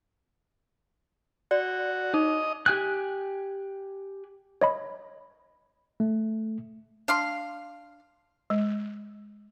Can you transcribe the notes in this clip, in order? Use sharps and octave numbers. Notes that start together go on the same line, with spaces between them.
F#4 D5
D#4 D#5
G4 G#5 F#6
C#5 D#5 B5
A3
D4 F5 C6
G#3